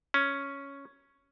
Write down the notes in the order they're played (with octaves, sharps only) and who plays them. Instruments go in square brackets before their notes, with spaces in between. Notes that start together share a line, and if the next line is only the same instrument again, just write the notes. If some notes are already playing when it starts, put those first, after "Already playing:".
[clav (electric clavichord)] C#4